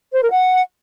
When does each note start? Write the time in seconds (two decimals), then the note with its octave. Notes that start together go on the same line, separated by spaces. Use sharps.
0.13 C5
0.22 A#4
0.32 F#5